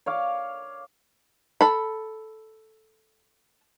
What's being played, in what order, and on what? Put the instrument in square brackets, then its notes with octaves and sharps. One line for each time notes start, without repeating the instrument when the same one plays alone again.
[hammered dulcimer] C#5 F5 D6
[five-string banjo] A4 B5